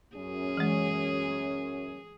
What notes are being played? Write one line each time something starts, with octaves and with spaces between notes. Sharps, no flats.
F#2 C#4 G#4
E3 G#3